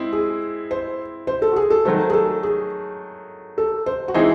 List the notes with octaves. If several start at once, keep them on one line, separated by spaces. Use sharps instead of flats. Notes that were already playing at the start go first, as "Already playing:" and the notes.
Already playing: G#3 C4 E4
G#4
C5
C5
A4
F#4
G#4
A4
D#3 F#3 A3 C5
G#4
A4
G#4
A4
C5
F#4
E3 G#3 C4 D#4 E4 G#4